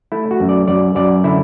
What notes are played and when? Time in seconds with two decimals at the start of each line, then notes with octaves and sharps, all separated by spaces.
0.12 A3 E4
0.31 F#4
0.40 F#2
0.49 D5
0.68 F#2 D5
0.95 F#2 D5
1.24 D3 E4